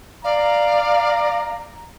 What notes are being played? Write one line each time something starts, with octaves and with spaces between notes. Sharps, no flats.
D5 F5 A#5